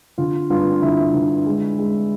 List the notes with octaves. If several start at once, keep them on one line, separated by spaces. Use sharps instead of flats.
D3 F4
G2 F4
D3 E4
D3
G#3
G#3